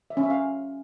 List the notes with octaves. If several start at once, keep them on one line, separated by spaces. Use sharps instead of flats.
E5
C#4
E5
F5